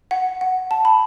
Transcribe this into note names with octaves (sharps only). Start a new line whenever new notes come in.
F#5
F#5
A5
B5